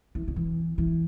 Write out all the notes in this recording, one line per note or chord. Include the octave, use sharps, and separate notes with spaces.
E3
D3
E3
E3